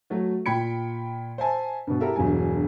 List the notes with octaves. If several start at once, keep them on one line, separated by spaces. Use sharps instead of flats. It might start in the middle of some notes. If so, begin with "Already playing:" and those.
F#3 A3 F#4
A#2 G5 B5 G#6 C#7
C5 E5 G#5 A5
G2 B2
E4 G4 A4 A#4 E5
E1 G2 F#3 G#5